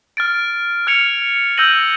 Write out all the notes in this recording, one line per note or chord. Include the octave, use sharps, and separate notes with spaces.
F6 A6 D7
F6 G#6 C#7 F7
E6 G6 A#6 D#7 F#7